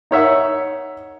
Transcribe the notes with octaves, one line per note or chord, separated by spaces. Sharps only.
D#4 C#5 E5 F#5